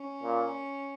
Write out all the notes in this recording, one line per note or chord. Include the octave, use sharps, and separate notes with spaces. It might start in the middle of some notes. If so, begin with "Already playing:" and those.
Already playing: C#4
A#2